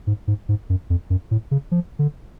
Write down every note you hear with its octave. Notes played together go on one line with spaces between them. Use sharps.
G#2
G#2
G#2
F#2
F2
F#2
A2
C#3
F3
D3